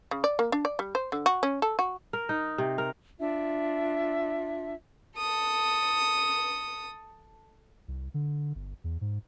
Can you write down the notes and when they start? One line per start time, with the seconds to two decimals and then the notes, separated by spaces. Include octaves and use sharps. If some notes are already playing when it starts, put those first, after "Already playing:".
0.11 C#3
0.24 D5
0.39 A#3
0.52 D4
0.65 D5
0.79 G3
0.95 C5
1.12 D3
1.26 F#4
1.43 C#4
1.62 A4
1.79 F#4
2.13 A#4
2.29 D#4
2.58 C3
2.78 A#4
3.19 D4 F4 E5
5.17 A4 D#6
7.88 C2
8.14 D3
8.55 G1
8.84 E2
9.01 G#2